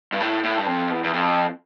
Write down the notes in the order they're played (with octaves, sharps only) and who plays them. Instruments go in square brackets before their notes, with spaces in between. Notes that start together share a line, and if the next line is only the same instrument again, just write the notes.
[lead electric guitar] G2
A2
A2
G2
F2
E2
E2
F2